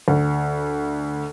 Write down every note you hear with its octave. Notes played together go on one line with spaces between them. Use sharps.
D2